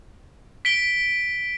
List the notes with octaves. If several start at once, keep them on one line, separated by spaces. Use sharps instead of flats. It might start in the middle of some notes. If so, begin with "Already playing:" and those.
B6 D7 G7